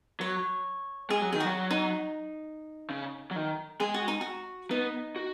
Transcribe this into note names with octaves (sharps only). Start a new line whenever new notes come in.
F#3 C#5
G#3 G#4
F#3
D#3 G#4
F#3 F#4
D#4
C#3
F#3
D#3
G#3 G#4
F#4
D#4
F#4
B3 D#4
F#4